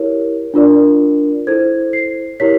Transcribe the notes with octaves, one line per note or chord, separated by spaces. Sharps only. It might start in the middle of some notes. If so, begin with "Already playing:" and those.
Already playing: E4 G4 A#4 C#5
D4 F4 A#4 D5
E4 A4 C5 G#6
C7
E4 G4 A#4 C#5 B6